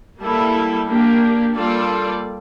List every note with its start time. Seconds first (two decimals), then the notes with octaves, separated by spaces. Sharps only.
0.20 G3 A#3 E4 A4
0.87 A#3 D4 G4 A#4
1.55 G3 A#3 F4 A4 D5